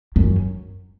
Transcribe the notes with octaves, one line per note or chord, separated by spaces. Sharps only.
F#2